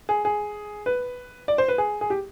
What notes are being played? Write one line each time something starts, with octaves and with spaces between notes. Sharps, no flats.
G#4
G#4
B4
D5
C5
B4
G#4
G#4
G4